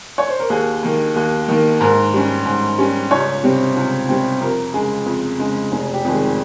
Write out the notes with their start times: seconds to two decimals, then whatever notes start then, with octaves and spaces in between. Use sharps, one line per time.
0.18 C#5
0.28 C5
0.40 A#4
0.50 D#2 G#4
0.83 D#3 A#3
1.16 D#2
1.48 D#3 A#3
1.81 G#2 A#4
2.13 G3 C#4
2.46 G#2
2.78 G3 C#4
3.11 C#2 C#5
3.44 C3 G3 C4
3.76 C#2
4.09 C3 G3 C4
4.41 F2 A#4
4.74 C#3 G#3 G#4
5.06 F2
5.39 C#3 G#3
5.72 F1 G#4
5.94 G4
6.05 F2 D#3 G#3
6.15 G#4